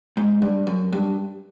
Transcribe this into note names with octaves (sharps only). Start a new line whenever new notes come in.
G#2
G2
F#2
G2